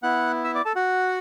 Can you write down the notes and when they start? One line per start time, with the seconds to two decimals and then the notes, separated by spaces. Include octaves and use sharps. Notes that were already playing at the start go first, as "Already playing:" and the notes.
0.03 B3 E4 F#5 F#6
0.44 E5 E6
0.55 D5 D6
0.65 A4 A5
0.75 F#4 F#5